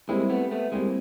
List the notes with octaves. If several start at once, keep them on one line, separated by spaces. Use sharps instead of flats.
G3 G#3 A#3 C4 E4
A3 B3
A3 B3
G3 G#3 A#3 C4 E4